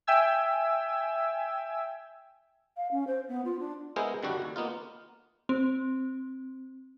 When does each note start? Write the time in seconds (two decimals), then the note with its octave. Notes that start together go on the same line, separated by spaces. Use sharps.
0.07 E5 G5 G#5 E6 G#6
2.77 F5
2.91 C#4
3.07 C5
3.28 B3
3.45 F4
3.60 D4
3.96 G#3 B3 E4 G#4 A#4 C5
4.23 F#2 D3 D#3 G3 D4 F#4
4.42 D#2
4.56 A#3 B3 D#4 F4
5.49 C4